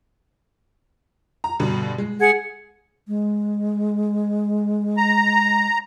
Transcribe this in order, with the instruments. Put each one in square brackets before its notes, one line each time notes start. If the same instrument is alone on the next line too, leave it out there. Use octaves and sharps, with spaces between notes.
[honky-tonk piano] A#5
G2 B2 D3
G#3
[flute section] G#4 F#5 G#6
[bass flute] G#3
[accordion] A#5